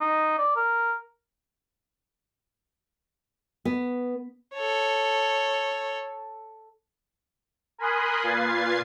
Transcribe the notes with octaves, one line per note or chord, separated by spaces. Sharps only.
D#4
D5
A#4
B3
A4 C#5
A#4 G#5 B5 C6 D#6 F#6
A#2 F4 B4 G#6 A6 C7